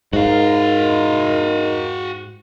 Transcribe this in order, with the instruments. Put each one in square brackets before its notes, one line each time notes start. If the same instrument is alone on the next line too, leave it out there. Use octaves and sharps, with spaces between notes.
[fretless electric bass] G#2 [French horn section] D#4 A#4 [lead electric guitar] F#4 F5